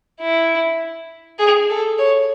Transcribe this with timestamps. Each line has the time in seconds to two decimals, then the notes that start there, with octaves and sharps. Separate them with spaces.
0.20 E4
1.39 G#4
1.69 A4
1.98 C#5